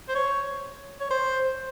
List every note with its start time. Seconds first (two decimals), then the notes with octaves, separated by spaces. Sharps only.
0.09 C5
0.15 C#5
1.01 C#5
1.10 C5